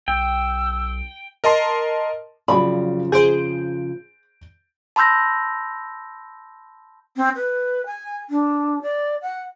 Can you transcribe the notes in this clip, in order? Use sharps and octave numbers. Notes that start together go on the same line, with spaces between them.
B1 G5 E6
A#4 D#5 A5 C6
F2 C#3 F3 F#3 D5 B5
G#4 C5 G6 D7
A5 B5 C6 E6 G6 A#6
C4
B4
G#5
D4
D5
F#5